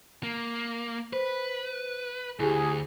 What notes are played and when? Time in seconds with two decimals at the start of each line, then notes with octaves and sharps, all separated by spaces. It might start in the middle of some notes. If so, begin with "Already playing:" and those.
0.23 A#3
1.13 B4 C5 B6
2.40 D2 E4 G4 G#4